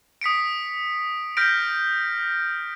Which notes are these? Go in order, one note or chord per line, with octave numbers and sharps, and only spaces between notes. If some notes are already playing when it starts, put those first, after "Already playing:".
D#6 B6 C#7 D7
F6 G6 A#6 B6 D7